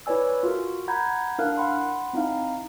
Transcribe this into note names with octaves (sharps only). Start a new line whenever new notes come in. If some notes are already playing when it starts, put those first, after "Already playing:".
E4 B4 C#5 D5 G#5 E6
F4 F#4 A#4
F#5 A#5 B5 G6 G#6
D4 E4 A#4 F5 F#6
F#5 B5 C6
C4 D#4 E4 F5